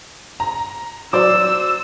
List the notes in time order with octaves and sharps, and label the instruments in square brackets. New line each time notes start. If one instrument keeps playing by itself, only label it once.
[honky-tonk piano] A#5
[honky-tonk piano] F#3 [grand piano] C5 D5 D6 [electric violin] E6